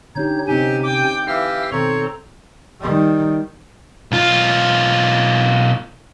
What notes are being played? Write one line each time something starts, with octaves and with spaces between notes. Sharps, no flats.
D3 C#4 D#4 G4 C#5 G6
C3 F#3 C4 C#4 D#4 G4 G#5
G5 D6
E3 G4 F5 E6 F6
B2 D#3 C4 A4 C#5 A#5
D#3 G3
B1 F4